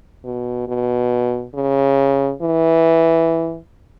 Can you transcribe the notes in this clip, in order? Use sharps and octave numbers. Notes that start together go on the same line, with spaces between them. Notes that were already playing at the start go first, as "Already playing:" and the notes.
B2
B2
C#3
E3